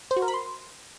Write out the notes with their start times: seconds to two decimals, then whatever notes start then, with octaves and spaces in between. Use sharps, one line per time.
0.11 C5
0.17 F#4
0.22 A#4
0.28 B5
0.34 C6